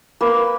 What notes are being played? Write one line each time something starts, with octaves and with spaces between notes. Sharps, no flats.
A#3 B4